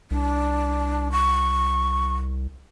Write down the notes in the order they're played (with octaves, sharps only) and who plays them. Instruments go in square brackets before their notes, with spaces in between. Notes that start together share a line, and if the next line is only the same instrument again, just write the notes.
[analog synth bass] C2 [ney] D4
[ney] C#6